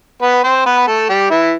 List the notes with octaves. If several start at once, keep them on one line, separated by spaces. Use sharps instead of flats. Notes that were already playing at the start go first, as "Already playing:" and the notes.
B3 B4
C4 C5
B3 B4
A3 A4
G3 G4
E3 E4